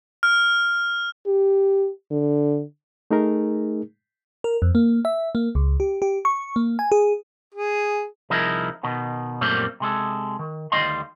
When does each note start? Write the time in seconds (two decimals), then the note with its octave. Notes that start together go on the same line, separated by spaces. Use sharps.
0.23 F6
1.27 G4
2.11 D3
3.11 A3 D#4 G#4 A#4
4.44 A#4
4.62 F2
4.75 A#3
5.05 E5
5.35 A#3
5.55 C#2
5.80 G4
6.02 G4
6.25 C#6
6.56 A#3
6.79 G#5
6.92 G#4
7.54 G#4
8.30 C2 F3 D#4 E4 G#4 A#4
8.83 B2 D#3
9.41 F#2 A#2 G3 A3 A#3 C4
9.80 C3 G#3 A4
10.39 D#3
10.72 D2 D#3 G3 D#5 F5 C6